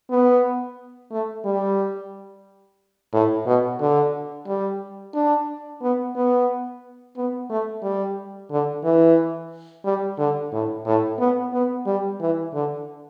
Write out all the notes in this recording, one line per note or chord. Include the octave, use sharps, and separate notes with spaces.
B3
A3
G3
A2
B2
D3
G3
D4
B3
B3
B3
A3
G3
D3
E3
G3
D3
A2
A2
B3
B3
G3
E3
D3